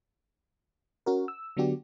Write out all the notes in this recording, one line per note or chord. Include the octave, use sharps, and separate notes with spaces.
C#4 F#4 A#4
E6
D3 F#3 B3 D4 F#4 G4